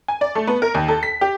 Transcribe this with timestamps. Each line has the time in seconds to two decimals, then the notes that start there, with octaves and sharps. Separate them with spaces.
0.08 G#5
0.21 D5
0.35 A3
0.47 B3
0.62 A#4
0.74 D#2
0.88 A4
1.03 B6
1.21 G4